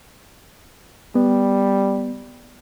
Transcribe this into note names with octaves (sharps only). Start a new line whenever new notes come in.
G3 B3